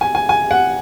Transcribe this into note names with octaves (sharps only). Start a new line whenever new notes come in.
G#5
G#5
G#5
F#5